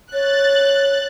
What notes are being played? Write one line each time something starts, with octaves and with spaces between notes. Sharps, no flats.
C#5 F#6 A6